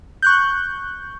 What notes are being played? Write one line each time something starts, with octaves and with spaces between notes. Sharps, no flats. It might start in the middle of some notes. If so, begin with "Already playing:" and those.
C#6 F#6 G6